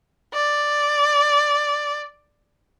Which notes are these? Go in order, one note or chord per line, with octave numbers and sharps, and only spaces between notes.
D5